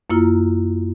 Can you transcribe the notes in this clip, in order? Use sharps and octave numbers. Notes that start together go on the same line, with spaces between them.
F#2 A#3 E4 F4